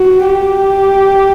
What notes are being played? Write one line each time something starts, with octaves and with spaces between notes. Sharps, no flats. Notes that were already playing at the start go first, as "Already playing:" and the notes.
Already playing: F#4
G4